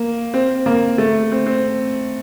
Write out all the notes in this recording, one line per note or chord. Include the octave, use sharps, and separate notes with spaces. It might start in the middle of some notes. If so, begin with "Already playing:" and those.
Already playing: A#3
C4
A#3
A3
C4
C4